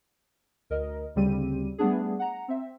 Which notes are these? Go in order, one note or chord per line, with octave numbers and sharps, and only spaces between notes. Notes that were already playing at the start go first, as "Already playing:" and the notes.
D2 A#4 D#5
D2 C#3 G3 C4 G4 D#7
G3 A3 B3 D4 G#4
F#5 A#5
C4 E5